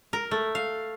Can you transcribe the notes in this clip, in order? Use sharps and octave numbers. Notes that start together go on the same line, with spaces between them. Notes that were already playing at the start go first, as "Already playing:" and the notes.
A#4
A3
F5